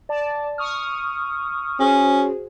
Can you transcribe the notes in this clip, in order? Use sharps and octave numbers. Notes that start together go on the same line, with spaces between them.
D5 A5
C#6 D#6 F6
C#4 F#4 G#4 C5